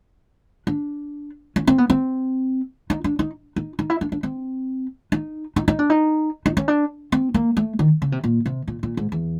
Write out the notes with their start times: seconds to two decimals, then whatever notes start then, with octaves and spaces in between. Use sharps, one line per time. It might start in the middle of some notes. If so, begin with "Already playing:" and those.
0.67 D4
1.56 C#4
1.67 C4
1.78 B3
1.90 C4
2.90 D#4
3.04 D4
3.19 D#4
3.56 D#4
3.79 D#4
3.90 E4
4.01 D4
4.12 D4
4.23 C4
5.12 D#4
5.56 D#4
5.68 D#4
5.79 D4
5.90 D#4
6.46 D#4
6.57 C#4
6.68 D4
7.12 C4
7.34 A#3
7.57 A3
7.79 D#3
8.02 C#3
8.12 C3
8.24 A#2
8.46 C3
8.68 A#2
8.83 A#2
8.97 G#2
9.12 E2